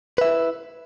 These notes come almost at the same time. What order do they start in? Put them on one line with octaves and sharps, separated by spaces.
B4 E5 E4